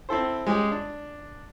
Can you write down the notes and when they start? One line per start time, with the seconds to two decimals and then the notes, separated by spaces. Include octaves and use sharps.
0.09 C4 E4 A4 C5
0.46 G#3 C#4 G4 G#4
0.72 D4